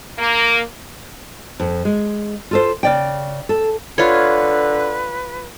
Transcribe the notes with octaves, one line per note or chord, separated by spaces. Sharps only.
A#3
F2
G#3
F4 A4 C5
C#3 D5 G5
A4
D3 F4 B4 C#5